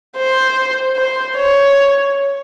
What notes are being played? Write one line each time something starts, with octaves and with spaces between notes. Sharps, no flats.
C5
C5
C#5